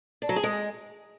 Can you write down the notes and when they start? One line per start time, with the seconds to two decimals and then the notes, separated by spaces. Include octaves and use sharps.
0.22 D4
0.29 F#3
0.36 G#4
0.44 G#3